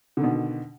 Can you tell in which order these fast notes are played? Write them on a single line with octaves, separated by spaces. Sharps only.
D3 D#3 B2